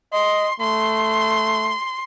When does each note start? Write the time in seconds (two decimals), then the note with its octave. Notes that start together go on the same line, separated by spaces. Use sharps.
0.13 D#5 C6
0.60 A3 C6